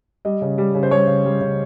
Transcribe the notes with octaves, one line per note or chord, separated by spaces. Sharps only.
G3 D#5
C#3
G3
C#3
C5
G3 C#5
C#3
G3
C#3